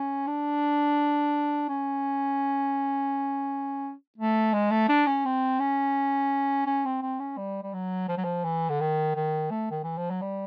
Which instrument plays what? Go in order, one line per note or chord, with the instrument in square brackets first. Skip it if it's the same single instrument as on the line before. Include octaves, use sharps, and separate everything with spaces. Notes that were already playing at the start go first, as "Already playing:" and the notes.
Already playing: [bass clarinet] C#4
D4
C#4
A3
G#3
A3
D4
C#4
C4
C#4
C#4
C4
C4
C#4
G3
G3
F#3
F3
F#3
F3
E3
D3
D#3
D#3
A3
D#3
E3
F3
F#3
G3